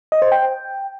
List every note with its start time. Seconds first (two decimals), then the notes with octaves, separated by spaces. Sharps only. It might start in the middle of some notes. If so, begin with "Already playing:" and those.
0.12 D#5
0.22 C5
0.32 G5